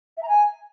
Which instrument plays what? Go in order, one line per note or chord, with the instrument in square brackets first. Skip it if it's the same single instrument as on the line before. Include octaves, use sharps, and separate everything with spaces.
[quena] E5
A#5
G#5